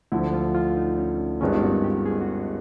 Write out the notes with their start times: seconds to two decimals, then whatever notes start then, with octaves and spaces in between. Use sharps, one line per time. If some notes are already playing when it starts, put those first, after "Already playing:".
0.12 D2 D3 F3 E4
0.33 F4
0.55 F4
0.76 D#4
0.98 C#4
1.40 G#1 G2 D#3 G#3 B3 C#4
1.54 F4
1.62 F#4
1.84 G4
2.06 G#4
2.21 F#4